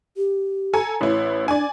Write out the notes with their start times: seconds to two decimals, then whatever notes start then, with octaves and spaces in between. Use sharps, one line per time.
0.17 G4
0.73 A4 G#5 A#5
1.01 A1 E4 C#5
1.48 D4 D5 G#5